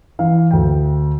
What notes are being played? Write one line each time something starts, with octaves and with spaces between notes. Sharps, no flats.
E3 F5
D2 G5